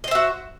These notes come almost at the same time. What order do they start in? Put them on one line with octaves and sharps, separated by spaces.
D#5 C5 E5 F#4